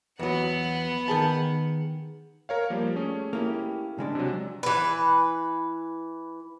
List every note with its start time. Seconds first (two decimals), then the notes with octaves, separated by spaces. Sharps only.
0.19 E2 F#3 B3 F#5
1.08 D#3 G#4 A5
2.49 A#4 C#5 F5
2.70 F3 G3 A#3
2.96 A3 C#4 G#4
3.33 A#3 E4 G4
3.98 C#3 G#3 D4
4.15 C3 F#3
4.63 E3 B4